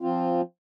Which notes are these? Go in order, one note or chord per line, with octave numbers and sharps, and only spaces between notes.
F3 C4 F4